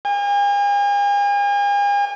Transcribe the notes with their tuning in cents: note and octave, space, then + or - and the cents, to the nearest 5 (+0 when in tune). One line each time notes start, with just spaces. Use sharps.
G#5 -45